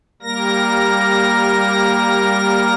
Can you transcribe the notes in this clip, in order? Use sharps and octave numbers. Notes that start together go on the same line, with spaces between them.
G3 A#3 A#4 A#6